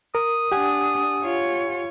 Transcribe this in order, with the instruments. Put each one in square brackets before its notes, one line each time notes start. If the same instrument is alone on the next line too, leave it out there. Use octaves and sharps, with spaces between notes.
[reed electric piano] A#4 [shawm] D#6
[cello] D4 [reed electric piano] G4 F#5 G#5
[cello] F4 C#5